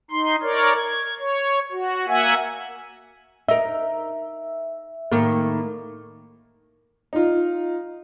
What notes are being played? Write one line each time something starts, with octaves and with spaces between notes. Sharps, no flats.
D#4 C6
A#4 C#5 D5
G#6
C#5
F#4
A#3 E5 F#5 G#5
D#4 A#4 E5
A2 D#3 A#3
D#4 F4